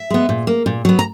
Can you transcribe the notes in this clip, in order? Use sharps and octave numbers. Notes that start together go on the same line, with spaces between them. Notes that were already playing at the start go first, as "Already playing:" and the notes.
Already playing: E5
G#3 B3
A#2
A#3
A#2
F#3 B3
A#5